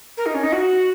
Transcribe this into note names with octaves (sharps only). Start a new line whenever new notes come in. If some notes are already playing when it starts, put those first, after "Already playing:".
A#4
D#4
C#4
D#4
F#4